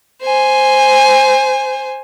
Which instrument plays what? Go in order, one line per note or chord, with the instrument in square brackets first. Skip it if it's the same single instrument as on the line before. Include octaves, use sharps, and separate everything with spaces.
[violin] C5 G#5